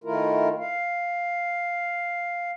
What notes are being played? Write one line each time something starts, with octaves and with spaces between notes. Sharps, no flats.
D#3 A3 E4 F4 A#4
F5